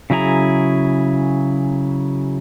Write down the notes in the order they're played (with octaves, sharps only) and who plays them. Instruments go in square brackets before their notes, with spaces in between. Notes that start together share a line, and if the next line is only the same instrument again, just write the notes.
[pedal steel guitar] C#3 F#3 E4 G#4 A#5